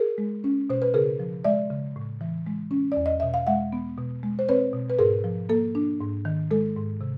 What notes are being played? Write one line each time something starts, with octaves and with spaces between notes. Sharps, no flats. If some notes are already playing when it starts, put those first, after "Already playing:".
Already playing: G#4 A#4
G#3
C#4
B2 C5
B4
C#3 G#4 A#4
F3
G#3 D5 E5
C#3
A2
E3
G#3
C#4
E2 D5
D#5
B2 E5
F5
G#3 E5 F#5
B3
B2
G#3
C5
C4 B4 C#5
B2
B4
G#2 G#4 A#4
F3
A#3 A4
D4
G#2
D#3
G#3 A4
G#2
C3